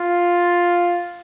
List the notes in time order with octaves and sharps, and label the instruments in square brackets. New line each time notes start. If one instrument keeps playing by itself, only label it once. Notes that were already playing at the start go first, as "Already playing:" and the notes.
Already playing: [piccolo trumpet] F4